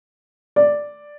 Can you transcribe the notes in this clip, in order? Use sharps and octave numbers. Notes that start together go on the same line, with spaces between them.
D5